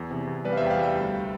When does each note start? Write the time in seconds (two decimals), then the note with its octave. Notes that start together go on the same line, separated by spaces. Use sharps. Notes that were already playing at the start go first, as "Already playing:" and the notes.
Already playing: E2
0.11 C3
0.27 E2
0.45 G3 B4 D5
0.52 F5
0.57 C5 E5
0.61 E2
0.66 G5
0.70 D5 F5
0.79 G3 E5 G5
0.95 D2